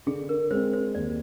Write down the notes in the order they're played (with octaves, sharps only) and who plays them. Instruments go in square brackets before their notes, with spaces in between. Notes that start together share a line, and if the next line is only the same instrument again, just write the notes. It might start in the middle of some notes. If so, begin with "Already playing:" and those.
[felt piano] D3 [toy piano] G#4
[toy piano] A#4
[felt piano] G#3 C4 [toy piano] C5
[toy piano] C5
[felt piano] D#2 [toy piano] D5